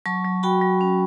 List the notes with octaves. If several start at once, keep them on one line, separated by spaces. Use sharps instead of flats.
F#3 A5 C#6
F#3
F#4 G5 B5
F#3
C#4